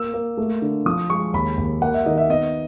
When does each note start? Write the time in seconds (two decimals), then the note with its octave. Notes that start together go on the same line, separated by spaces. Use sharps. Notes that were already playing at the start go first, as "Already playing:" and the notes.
Already playing: A#3 E6
0.14 A#3
0.37 A3
0.62 D3
0.86 F3 D#6
1.10 G#3 C#6
1.34 D#2 B5
1.57 D#2
1.82 A#3 F#5
1.94 E5
2.06 D#3 D#5
2.18 E5
2.29 B3 D#5